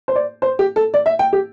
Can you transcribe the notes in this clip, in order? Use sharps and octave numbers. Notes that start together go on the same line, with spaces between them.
C5
D5
C5
G4
A4
D5
E5
G5
G4